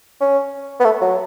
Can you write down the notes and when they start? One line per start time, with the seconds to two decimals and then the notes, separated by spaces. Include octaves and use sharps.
0.20 C#4
0.80 B3
0.85 A3
1.01 F#3